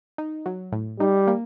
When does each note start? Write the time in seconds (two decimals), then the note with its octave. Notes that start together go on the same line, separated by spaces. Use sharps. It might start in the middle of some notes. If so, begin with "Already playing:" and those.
0.18 D#4
0.46 F#3
0.72 A2
1.00 G3 D#4
1.27 A#3